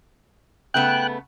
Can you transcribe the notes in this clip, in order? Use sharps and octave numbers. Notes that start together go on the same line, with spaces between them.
C#3 A3 B3 G5 F#6